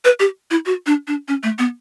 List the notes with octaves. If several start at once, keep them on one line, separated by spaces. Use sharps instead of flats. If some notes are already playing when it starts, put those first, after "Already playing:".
B4
G4
E4
F#4
D4
D4
C#4
A3
B3